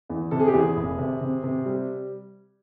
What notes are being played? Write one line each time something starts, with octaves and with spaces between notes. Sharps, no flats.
E2
C3 A4
G#4
G4
E2 G#4
F1
C3
C3
C3
G3